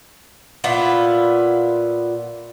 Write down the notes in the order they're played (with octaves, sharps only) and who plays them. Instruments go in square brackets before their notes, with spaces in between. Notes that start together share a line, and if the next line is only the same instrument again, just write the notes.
[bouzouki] A#2 B3 E4 F4